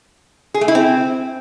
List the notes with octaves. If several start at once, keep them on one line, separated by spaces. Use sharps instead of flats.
G#4
A3
E4
C4